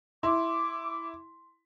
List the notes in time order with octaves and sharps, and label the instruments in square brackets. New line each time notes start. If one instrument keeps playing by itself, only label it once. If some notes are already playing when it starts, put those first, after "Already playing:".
[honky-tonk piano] E4 [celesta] C6 [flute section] D6